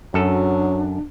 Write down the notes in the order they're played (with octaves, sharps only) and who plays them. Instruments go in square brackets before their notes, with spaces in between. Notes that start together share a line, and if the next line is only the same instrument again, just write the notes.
[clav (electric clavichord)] F#2 A4 [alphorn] F#3 [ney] D4